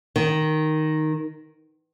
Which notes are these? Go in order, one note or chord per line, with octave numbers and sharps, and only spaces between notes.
D#3